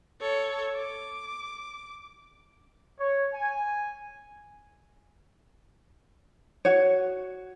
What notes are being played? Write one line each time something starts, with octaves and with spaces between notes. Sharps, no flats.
A4 C#5
D6
C#5
G#5
F#4 C#5